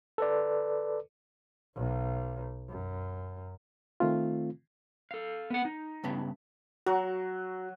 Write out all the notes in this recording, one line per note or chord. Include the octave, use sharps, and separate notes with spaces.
A4 B4 D5
B1
F#2
D#3 A3 C4 F4
A4 F5
B3 F#5
D#4
G2 C#3 B3
F#3 F#4